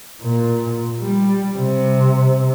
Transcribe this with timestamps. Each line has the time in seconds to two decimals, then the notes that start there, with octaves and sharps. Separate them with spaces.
0.22 A#2
1.00 G3
1.58 C3